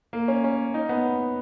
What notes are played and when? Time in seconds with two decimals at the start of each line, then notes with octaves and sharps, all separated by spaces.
0.13 A#3
0.28 C#4
0.44 C#4
0.74 D#4
0.89 B3